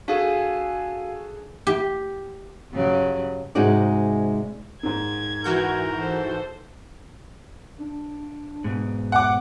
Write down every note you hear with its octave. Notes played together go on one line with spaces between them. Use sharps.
D4 F#4 G#4 A4 F5 G#5
G4
G2 C#3 F#3
G#2 C3 G#3 D#4 F#4 D5
G#2 D#3 G#6
E3 F#4 A#4 G6
A4 C5
D4
G#2 B2
F#5 D6